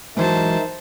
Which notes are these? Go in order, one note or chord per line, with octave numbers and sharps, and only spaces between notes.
G#2 E3 F#3 D#4 A#4 C5 E5 A5